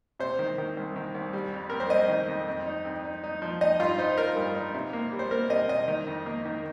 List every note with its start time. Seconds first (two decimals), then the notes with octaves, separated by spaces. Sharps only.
0.19 C3 C5
0.39 D#3
0.58 D#3
0.77 C2
0.96 D#3
1.14 C2
1.33 G3
1.53 F2
1.70 F2 A#4
1.80 C5
1.90 F2 D#5
2.09 D#3
2.28 F2
2.48 F2
2.66 D#4
2.85 F2
3.04 D#4
3.24 D#4
3.42 F3
3.61 D#4 D#5
3.80 G2 F4
3.98 D#4 C5
4.18 D#4 A#4
4.36 G2
4.55 D#4
4.74 C3
4.93 A#3
5.12 G3
5.19 C5
5.31 A#3 A#4
5.50 C3 D#5
5.69 C3 D#5
5.88 D#3
6.07 F2
6.26 A#3
6.45 D#3